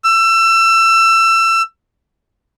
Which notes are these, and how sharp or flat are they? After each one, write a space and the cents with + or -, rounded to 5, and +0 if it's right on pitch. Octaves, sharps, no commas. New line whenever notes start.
E6 +25